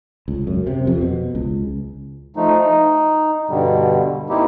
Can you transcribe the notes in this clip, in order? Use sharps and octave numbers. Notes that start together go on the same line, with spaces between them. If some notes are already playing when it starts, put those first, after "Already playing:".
C#2
F#2
C3
F2
B2
C#2
F3 A3 D#4
D#4
G2 B2 D3 G3
A#3 C4 D#4 E4 G4